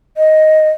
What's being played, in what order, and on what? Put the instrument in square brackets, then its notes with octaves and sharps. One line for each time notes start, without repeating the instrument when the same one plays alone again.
[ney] D#5